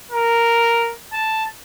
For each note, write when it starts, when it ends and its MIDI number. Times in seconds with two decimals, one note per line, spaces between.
0.12 0.93 70
1.13 1.44 81